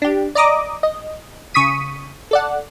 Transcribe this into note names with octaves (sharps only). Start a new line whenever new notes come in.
D4 G4
D5 D#5 A#5 D6 D#6
D#5
C#3 C#6 D#6 B6 D#7
A4 D5 F#5